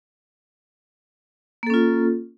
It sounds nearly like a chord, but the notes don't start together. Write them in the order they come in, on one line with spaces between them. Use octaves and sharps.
A#3 A4 C#4 F4